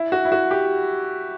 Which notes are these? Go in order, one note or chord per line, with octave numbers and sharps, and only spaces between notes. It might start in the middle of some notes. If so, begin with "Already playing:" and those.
Already playing: E4
F#4
E4
F#4
G4